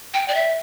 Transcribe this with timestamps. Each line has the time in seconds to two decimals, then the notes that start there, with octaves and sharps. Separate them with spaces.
0.14 G5
0.28 D5
0.34 E5